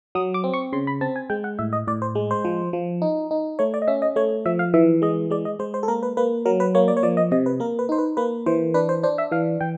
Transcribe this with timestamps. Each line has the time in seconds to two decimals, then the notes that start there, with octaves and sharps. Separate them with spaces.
0.15 F#3 D#6
0.34 D6
0.44 C4
0.54 C#6
0.73 C#3 C6
0.87 B5
1.01 C4 A5
1.16 G#5
1.30 G#3 G5
1.44 F#5
1.59 A2 E5
1.73 D#5
1.87 A2 D5
2.02 C5
2.15 G#3
2.31 C5
2.45 F3
2.73 F3
3.02 D#4
3.31 D#4
3.59 A3 C#5
3.74 D5
3.82 D#5
3.88 C#4 E5
4.02 D#5
4.16 A3 C#5
4.46 F3 E5
4.59 F5
4.74 E3 E5
5.02 G#3 D#5
5.30 G#3 D5
5.45 D#5
5.59 G#3 C5
5.74 C5
5.83 A4
5.88 A#3 A#4
6.03 B4
6.17 A#3 B4
6.46 F#3 A#4
6.60 B4
6.75 A#3 C#5
6.88 D5
6.97 C#5
7.03 F3 D5
7.17 D#5
7.32 C3 D#5
7.46 B4
7.60 A#3 A#4
7.79 B4
7.89 D#4 C5
7.98 B4
8.17 A#3 B4
8.46 E3 C5
8.74 D4 B4
8.89 C5
9.03 D4 C5
9.18 E5
9.31 E3 F5
9.61 E3 G5